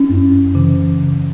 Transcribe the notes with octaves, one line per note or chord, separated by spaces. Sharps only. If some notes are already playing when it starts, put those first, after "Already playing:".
Already playing: C#4
F#2
C#3 E3